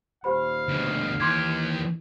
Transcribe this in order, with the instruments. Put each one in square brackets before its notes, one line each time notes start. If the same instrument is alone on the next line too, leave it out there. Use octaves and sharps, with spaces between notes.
[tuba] D#1 [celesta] G4 C5 B5 [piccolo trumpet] F5
[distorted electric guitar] D2 B2
[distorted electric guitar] D#2 G4 [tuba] E3 [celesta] C6 D6 G#6